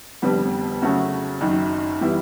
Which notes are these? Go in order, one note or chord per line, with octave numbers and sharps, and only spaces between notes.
F1 F2 D3 G3 B3
C#3 F#3 A3 C#4 F#4
F#1 F#2 D#3
E3 G3 B3 E4